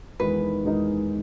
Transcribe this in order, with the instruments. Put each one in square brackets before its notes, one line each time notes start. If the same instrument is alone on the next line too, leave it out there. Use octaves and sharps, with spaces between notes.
[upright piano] E2 D#3 G#3 D#4 A#4 [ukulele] B4
[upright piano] E2 D#3 G#3 D#4 A#4